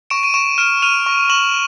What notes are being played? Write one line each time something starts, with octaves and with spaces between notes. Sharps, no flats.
C#6 D7 E7
D#7
C#6 D7 E7
F6 D7 E7
F6 D#7 F7
C#6
C#6 E7 F#7